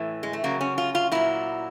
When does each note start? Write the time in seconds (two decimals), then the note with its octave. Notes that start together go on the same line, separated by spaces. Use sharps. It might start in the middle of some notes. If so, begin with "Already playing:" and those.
Already playing: A2 E3
0.23 G#3
0.33 A3
0.44 C#3 F#3 A#3
0.61 C#4
0.78 F4
0.95 F4
1.12 A#2 F#3 E4